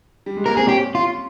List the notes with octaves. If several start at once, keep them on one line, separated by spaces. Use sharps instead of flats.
G3
G#3
A#3 A#4
C4 G#4
C#4 G4
F4